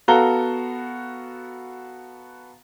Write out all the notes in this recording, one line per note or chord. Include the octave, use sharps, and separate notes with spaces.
B3 F#4 A4 F5 A#5 G7